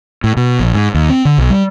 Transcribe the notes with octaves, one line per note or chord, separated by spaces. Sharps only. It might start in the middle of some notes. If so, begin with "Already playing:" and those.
A2
B2
A#1
G#2
D#2
C4
D3
B1
G3